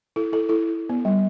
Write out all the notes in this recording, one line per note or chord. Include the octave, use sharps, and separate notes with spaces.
E4 A4
E4 A4
E4 A4
B3
G3